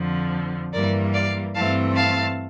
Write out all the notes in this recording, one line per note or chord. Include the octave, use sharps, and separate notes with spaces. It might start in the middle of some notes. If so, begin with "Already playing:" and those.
Already playing: F2 D3 F3
G2 E3 G3 A#3 A#4 D5
D5 F5
G2 E3 A3 C4 F5 A5
F5 A5